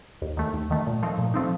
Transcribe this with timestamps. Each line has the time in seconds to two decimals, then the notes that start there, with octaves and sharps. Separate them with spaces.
0.22 D#2
0.37 D#3 A3
0.53 D#2
0.71 D#3 A3
0.87 A#2
1.03 F3 A3 C4 D#4
1.18 A#2
1.34 F3 A3 C4 D#4